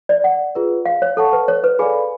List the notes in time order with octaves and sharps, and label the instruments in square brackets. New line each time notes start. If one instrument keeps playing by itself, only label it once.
[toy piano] D5
F#5
[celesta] F4 G#4 B4
[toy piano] F5
C#5
[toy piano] A4 [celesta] C#5 F#5 A5 C#6
[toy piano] B4
C#5
B4
[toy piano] G#4 [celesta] A4 D5 F5 G#5 B5